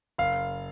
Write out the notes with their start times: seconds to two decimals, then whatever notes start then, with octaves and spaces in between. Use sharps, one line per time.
0.18 F#1 F5